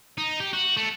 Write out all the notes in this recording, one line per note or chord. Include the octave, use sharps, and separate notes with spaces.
D#4
G4
F#4
A3